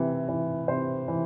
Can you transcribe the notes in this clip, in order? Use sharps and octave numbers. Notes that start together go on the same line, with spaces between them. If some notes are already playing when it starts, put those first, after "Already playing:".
Already playing: C3 E3
E3
C3 C5
E3